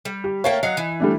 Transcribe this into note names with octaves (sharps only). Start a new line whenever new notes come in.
G3
G4
A3 A#3 C#5 F5 G5
F#3 F#4 D#5 F5
E3
G3 A3 D4